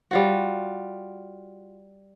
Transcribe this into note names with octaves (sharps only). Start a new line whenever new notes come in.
G3 F4 F#4